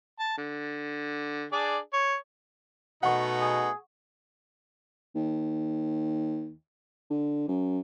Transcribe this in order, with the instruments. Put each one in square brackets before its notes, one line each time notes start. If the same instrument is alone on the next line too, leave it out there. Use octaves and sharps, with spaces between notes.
[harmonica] A5
D3
D4 G#4 D5
C#5
[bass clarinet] B2 [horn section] A3 B3 D#4 [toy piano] F#5 C#6
[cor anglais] G#4
[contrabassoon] D#2
D3
F#2